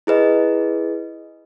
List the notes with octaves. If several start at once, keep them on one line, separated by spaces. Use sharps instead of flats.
E4 G#4 B4 D#5